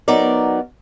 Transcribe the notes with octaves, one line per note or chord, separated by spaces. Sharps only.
F#3 B3 D#4 A#4 D5